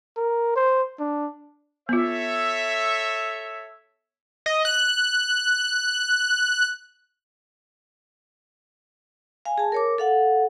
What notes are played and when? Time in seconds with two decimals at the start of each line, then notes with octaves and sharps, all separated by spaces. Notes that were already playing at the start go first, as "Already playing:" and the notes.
0.17 A#4
0.56 C5
1.00 D4
1.89 B3 F4 A4 C#5 E5
4.46 D#5
4.65 F#6
9.45 F5 G#5
9.58 G#4 A5
9.72 A#4 C#5 D6
9.98 A4 F5 F#5